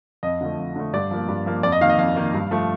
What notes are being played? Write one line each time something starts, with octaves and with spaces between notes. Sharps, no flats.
F2 D#5
D3 F3 A3
F2
D3 F3 A3
G2 D5
F3 A#3
G2
F3 A#3
F2 D5
D#5
D#3 A#3 F5
D#5
F2 F5
D#3 A#3
G2
F3 A3